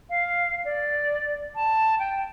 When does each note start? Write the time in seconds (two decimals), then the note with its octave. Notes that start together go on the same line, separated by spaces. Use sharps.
0.10 F5
0.65 D5
1.55 A5
1.99 G5